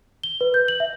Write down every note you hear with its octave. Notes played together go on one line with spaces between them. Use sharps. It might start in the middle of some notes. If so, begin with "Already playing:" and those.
G7
B4
G6
F#7
E5